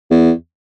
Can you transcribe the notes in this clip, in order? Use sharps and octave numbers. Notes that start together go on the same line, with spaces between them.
E2